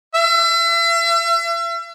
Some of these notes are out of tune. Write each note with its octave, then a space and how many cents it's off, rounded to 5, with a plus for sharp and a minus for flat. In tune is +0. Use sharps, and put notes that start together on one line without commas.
E5 +40